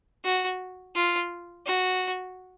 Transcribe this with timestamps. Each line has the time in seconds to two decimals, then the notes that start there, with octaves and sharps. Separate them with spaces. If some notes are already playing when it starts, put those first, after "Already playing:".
0.25 F#4
0.96 F4
1.66 F#4